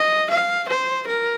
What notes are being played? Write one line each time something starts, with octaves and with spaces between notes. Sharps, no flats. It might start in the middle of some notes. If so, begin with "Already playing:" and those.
Already playing: D#5
F5
C5
A#4